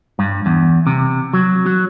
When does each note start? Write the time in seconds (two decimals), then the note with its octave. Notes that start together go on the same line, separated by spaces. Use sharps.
0.19 G2
0.46 E2
0.87 C3
1.33 F#3
1.66 F#3